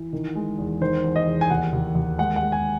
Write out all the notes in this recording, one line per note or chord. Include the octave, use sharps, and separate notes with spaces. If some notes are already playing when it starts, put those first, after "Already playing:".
Already playing: E3
D#3
G#3
E2
D#3 C5
E2
D#5
E2
G#5
D#2 F#5
D#2
D#2
G#3 F#5
F#5
G#3
G#5